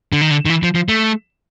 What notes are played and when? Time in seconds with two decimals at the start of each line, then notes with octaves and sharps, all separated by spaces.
0.12 D3
0.21 D#3
0.31 D3
0.45 D#3
0.50 E3
0.63 F3
0.75 F3
0.88 A3